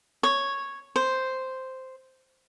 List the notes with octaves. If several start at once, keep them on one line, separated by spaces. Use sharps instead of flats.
C#5
C5